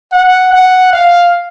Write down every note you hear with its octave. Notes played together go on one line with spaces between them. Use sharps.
F#5
F#5
F5